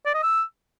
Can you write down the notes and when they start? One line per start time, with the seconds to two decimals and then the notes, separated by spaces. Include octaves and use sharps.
0.06 D5
0.15 D#5
0.23 E6